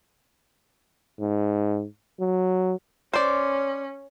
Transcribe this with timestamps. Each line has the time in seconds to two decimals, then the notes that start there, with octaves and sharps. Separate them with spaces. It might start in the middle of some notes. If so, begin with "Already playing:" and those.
1.19 G#2
2.20 F#3
3.14 C#4 C5 D5